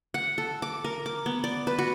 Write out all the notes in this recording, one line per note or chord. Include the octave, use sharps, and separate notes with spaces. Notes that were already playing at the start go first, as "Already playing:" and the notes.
F#5
A4
D6
A#4
D6
B3
D5
B4
F#4